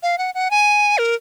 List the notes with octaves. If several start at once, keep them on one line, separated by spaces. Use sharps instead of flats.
F5
F#5
F#5
G#5
A#4